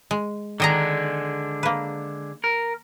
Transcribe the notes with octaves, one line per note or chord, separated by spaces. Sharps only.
G#3
D3 D#3 G#3 D4 D#5 A#5
A#3 B4
A#4